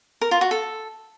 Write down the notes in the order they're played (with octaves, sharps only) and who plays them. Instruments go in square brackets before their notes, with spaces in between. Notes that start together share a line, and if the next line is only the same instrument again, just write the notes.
[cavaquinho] A#4
F4
F#4
A4